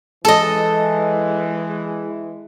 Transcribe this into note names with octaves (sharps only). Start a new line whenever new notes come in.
E3 G#3 A4 D#5